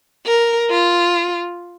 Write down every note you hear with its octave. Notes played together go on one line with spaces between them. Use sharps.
A#4
F4